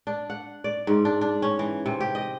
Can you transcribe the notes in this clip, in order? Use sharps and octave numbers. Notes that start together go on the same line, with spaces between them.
D4
F#5
D5
G#2
D4
D4
C#4
E3
C3
G4
D#5